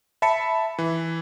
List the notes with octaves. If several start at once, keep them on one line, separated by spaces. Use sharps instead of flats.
E5 A5 B5 B6 C#7
E3